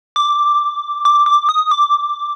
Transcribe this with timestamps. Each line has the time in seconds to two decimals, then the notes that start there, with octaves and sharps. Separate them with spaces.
0.16 D6
1.05 D6
1.26 D6
1.49 D#6
1.71 D6